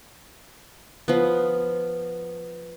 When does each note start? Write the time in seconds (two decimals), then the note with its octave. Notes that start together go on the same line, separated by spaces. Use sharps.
1.08 F3 B3